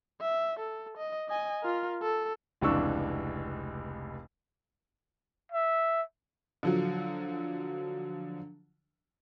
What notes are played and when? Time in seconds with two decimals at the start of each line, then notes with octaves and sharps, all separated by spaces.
0.21 E5
0.59 A4
0.98 D#5
1.29 D#5 G#5
1.63 F4 A#4
2.02 A4
2.61 F1 C#2 E3 D4 C#6 E6
5.52 E5
6.63 D3 F3 F#3